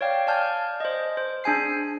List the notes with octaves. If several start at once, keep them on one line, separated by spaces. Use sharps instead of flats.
C#5 D5 F5 G5
D5 F5 G#5 A5 F6 G6
C5 D#5
C5
D4 G#4 G#5 C7